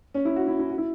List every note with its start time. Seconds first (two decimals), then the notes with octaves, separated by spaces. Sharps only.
0.14 C#4
0.25 E4
0.36 F#4
0.48 E4
0.59 E4
0.70 F#4
0.78 E4